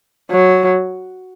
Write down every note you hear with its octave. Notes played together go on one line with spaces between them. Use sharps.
F#3